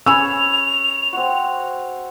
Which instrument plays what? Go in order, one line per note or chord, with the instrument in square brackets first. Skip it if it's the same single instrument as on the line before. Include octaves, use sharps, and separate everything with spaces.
[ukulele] C#4 G#5 B5 [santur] G#4 B4 C#5 [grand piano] E6 [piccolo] F7
[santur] C4 F#4